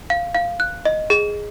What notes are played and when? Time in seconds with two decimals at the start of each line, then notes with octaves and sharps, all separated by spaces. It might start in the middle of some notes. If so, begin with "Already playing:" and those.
0.10 F5
0.35 F5
0.60 F#6
0.85 D#5
1.10 G#4